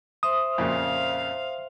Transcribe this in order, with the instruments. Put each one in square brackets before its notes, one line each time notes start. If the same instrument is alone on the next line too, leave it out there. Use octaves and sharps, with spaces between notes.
[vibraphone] C5 E5 C6 [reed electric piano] D#6
[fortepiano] F2 A#2 C#3 [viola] F5